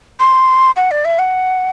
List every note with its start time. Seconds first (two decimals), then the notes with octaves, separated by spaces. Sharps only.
0.20 C6
0.76 F#5
0.91 D5
1.05 E5
1.19 F#5